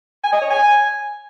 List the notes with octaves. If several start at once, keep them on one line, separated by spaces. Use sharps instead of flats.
G#5
D#5
C#5
G#5